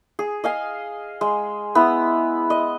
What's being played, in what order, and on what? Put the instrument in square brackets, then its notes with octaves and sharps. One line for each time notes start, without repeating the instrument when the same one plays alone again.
[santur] G#4
D#5 F5 G#5
G#3
B3 E4
D#5